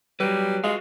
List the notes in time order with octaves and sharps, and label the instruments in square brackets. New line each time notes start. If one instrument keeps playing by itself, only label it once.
[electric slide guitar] F#3 B4 [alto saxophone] G3
[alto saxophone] G#3 [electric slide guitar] F4 F#4 F5